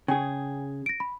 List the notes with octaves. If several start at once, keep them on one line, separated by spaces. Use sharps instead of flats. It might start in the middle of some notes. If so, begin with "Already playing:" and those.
C#3 G#4 G5 G#5
A#6 D7
B5